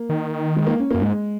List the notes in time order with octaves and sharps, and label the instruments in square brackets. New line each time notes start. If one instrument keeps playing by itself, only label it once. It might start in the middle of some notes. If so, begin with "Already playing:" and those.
Already playing: [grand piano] A#3
[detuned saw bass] D#3
[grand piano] G#3
A#3
C#4
[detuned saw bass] F#2 [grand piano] A#3
[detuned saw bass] G#2 [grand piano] G#3